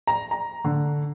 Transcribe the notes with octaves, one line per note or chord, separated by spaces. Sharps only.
A#5
A#5
D3